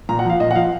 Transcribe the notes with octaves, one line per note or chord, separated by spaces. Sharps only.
A#2 A#5
F#5
F3 F5
A#2 D#5
F#5
F3 F5